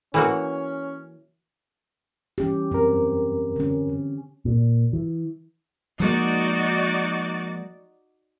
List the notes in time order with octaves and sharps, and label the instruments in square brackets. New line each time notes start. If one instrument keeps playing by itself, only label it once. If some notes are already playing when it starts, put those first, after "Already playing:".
[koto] E3 A#3 F#4 [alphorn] C#4
[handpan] E3 C#4 G4
[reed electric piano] F#2 A#4 [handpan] C4
[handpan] D3 C#4
[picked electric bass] A#2
E3
[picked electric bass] F3 G#3 A#3 [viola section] D#4 F#4 D5